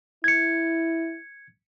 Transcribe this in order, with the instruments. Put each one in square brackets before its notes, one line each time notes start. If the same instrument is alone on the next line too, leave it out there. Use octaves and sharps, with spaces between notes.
[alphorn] E4 [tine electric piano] G#6 C#7